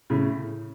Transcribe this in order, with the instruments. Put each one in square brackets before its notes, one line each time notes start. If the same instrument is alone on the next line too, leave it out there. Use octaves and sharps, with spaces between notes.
[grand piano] A2 C#3